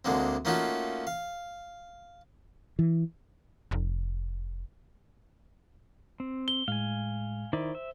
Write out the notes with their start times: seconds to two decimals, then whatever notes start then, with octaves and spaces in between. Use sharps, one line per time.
0.05 D2 D3 G#3 A#3 C4
0.45 A3 A#3 C#4 D#4 F4 F#4
1.07 F5
2.79 E3
3.71 F1
6.20 C4
6.48 G7
6.68 A2 G#3 F5 G#5
7.53 D#3 E4 C5 D5
7.75 E5